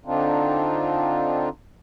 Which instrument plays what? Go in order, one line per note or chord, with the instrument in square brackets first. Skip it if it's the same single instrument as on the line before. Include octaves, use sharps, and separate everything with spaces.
[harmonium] D3 C4 D4 D#4 F4